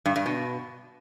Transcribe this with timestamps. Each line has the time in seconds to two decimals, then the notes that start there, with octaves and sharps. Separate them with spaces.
0.06 G2
0.16 G2
0.26 B2